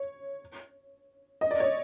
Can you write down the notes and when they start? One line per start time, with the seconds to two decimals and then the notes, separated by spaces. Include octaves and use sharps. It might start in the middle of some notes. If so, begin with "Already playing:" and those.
Already playing: C#5
1.41 D#5
1.51 D5
1.60 C#5